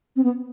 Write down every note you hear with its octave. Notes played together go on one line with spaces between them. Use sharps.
C4
B3